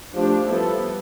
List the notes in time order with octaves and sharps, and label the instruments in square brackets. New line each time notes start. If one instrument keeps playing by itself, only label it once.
[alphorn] F3 [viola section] A3 D4 G4
[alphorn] F3 [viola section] G3 B3 E4 A4